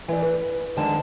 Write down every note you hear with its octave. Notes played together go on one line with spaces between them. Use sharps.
E3 D5
B4
F2 D3 D#3 G#3 A5